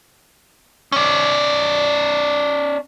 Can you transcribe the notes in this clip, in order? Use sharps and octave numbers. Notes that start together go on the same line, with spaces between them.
C#4 D5